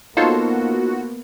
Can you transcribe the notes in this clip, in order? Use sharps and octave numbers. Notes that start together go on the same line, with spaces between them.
A#3 B3 D#4 F4 F#4 A4 C5 C#5